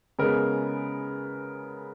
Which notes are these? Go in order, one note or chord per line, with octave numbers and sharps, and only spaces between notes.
C#3 G#3 B3 A#4